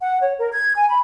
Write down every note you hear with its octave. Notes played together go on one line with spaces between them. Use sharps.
F#5
C#5
A#4
G#6
G#5
B5